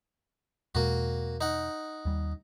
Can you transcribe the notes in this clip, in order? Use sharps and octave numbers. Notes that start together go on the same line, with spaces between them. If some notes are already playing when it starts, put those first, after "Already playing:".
E2 B2 G#3 A#3 F#4
D#4 F#5
D#2 G3